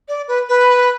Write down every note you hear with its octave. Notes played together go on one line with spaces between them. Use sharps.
D5
B4
B4